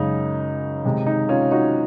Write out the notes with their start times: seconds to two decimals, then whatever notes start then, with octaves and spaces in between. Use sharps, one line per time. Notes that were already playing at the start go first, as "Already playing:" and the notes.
Already playing: F#2 C#3 G#3 D#4
0.85 C3 D#3 G#3
1.06 D#4
1.29 C#4 F4
1.52 D#4 F#4